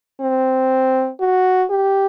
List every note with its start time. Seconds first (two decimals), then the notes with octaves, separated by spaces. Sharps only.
0.21 C4
1.20 F#4
1.70 G4